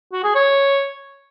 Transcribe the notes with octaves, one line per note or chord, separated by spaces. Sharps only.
F#4
G#4
C#5